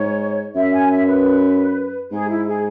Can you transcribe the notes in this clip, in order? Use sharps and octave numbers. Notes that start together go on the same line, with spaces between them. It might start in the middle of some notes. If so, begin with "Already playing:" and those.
Already playing: G#2 C#5
F#2 E5
G#5
E5
B4
G#2 G#4
E4
G#4